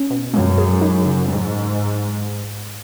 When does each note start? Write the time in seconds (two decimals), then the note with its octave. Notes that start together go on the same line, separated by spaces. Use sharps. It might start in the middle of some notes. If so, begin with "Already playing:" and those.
Already playing: C#4
0.10 B2
0.33 F#2 G#3
0.58 G#4
0.81 D#4
1.05 C#3
1.29 G#2 F#3